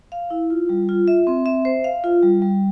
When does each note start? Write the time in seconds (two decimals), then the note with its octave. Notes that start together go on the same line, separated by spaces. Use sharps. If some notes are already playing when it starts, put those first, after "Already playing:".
0.12 F5
0.30 E4
0.50 F4
0.69 G3
0.89 F4
1.08 E5
1.27 C4
1.46 E5
1.65 C5
1.84 F5
2.04 F4
2.23 G3
2.42 G3